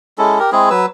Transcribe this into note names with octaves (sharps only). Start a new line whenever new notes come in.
G#3 C#4 E4 A4
G4 A#4
G#3 C4 E4 G#4
F#3 B4 E6